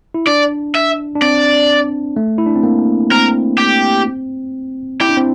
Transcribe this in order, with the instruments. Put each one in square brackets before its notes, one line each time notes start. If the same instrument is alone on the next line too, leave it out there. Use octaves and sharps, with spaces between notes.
[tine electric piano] E4
[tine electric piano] D4 [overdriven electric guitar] D5
[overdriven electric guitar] E5
[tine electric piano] D4
[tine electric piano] C4 [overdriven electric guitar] D5
[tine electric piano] A3
E4
D4
C4
A#3
[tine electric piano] C4 [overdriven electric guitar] A#4
[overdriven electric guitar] G4
[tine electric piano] E4 [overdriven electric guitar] G4
[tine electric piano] D4
C4